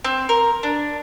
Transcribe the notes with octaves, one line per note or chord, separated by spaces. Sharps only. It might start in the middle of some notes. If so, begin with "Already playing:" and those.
C4
A#4
D4